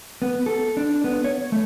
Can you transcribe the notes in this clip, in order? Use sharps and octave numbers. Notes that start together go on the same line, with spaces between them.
B3
A4
D4
B3
C#5
A3